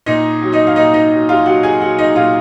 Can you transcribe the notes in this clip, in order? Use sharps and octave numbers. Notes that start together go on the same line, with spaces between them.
A#2 D#4 D#5
F#3
D#4 D#5
F5
A#2 D#4 D#5
D#4 D#5
F#3
F4 F5
F#3 F#4 F#5
G#4 G#5
F#3 F#4 F#5
D#4 D#5
A#2 F4 F5